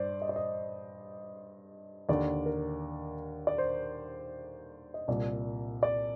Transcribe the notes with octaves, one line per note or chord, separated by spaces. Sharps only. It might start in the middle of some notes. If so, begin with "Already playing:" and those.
Already playing: G2 C5 D5
D#5
D5
D#5
D#2 D3 D5
A#4
D5
C5
D#5
C2 A#2 D5
D5